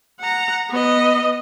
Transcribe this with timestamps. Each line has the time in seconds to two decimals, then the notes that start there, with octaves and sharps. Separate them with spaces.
0.20 F#5 A#5
0.70 B3 D#5